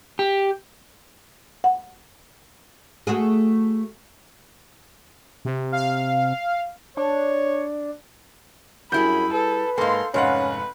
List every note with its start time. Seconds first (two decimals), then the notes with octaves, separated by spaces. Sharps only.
0.19 G4
1.64 F#5
3.07 A3 F#4 G#4
5.45 C3
5.72 F5
6.97 D4 C#5
8.92 F#2 G3 E4 G#4 B5 G6
9.33 A4 B4
9.78 G#2 A#3 A4 F5 C6
10.14 F1 G#2 C#4 B4 F5 F#5